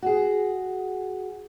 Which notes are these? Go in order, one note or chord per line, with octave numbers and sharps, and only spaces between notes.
F#4 G#4